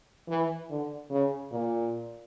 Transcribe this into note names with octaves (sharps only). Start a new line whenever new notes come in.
E3
D3
C#3
A#2